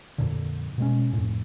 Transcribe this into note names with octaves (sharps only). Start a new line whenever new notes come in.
F2 A#2 D3
B2 G#3 C#4
F2 A2